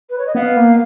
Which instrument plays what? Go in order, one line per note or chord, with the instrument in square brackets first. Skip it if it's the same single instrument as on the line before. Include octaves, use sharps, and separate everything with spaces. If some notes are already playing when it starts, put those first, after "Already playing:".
[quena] B4
C#5
D#5
[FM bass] B3 [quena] F5
[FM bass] A#3